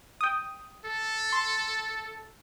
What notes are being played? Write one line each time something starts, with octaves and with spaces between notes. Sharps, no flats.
G5 D#6
A4
C6